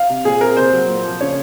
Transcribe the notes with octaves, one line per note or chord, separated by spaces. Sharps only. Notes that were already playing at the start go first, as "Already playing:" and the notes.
Already playing: F5
C3
A#2 G#4
C4 A#4
C3 C5
F#3
A#2
F3
C#3 C#5